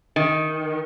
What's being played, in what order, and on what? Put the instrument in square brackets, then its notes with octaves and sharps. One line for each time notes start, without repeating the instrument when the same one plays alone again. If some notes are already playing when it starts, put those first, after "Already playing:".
[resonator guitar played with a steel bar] D#3